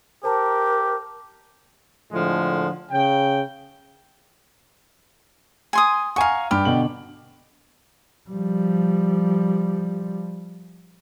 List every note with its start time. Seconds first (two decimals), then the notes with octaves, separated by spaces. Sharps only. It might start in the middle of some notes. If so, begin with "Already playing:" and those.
0.24 G4 A#4 C5 A5 A#5
2.12 A2 D3 F3 G#3
2.91 C#3 G5
5.73 G#5 C6 D#6
6.16 F5 F#5 G#5 A#5 C#6
6.51 G2 G4 B5 F6
6.65 B2 D3 F#7
8.30 F3 G3